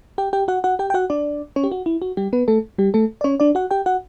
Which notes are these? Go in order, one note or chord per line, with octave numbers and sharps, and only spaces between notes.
G4 G5
G4 G5
F#4 F#5
F#4 F#5
G4 G5
G5
F#4 F#5
D4 D5
C#4 C#5
G4
F#4
E4
F#4
G3 G4
B3 B4
A3 A4
G3 G4
A3 A4
D5
C#4 C#5
D4 D5
F#4 F#5
G4 G5
F#4 F#5